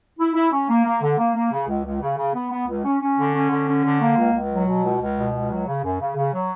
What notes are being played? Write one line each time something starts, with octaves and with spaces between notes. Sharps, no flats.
E4
E4
C#4
A#3
A#3
D3
A#3
A#3
C#3
C#2
C#2
C#3
C#3
B3
B3
C#2
C#4
C#4
D3
C#4
D3
C#4
D3
A#3
C#2
C#2
F#3
B2
C#2
C#2
B2
C#2
F#3
C#3
F#2
C#3
C#3
F#3